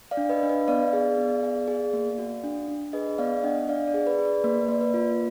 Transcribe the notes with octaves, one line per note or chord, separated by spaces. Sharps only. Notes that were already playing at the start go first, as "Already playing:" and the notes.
D5 F5
D4
B4 D#5
D4 F5
B4 D#5
B3 D5 F5
G#4
B3
G#4
G#4
A#3
F#4
D4
D4
G#4 B4 D#5
B3 D5 F5
D4 D#5 F#5
D4 D5 F5
D5
G#4
B4
G#4
D5
A#3 B4
A#3 D5
B4
F4